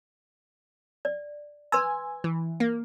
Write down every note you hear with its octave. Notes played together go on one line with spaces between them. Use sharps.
D5
B4 G#5 C6 E6
E3
A#3